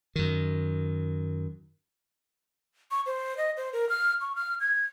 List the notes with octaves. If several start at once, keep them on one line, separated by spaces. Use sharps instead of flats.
F#2 D#3
C#6
C5
D#5
C5
A#4
F6
C#6
F6
G#6